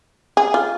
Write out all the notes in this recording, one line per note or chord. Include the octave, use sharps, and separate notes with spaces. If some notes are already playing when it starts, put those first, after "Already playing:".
G#4
F4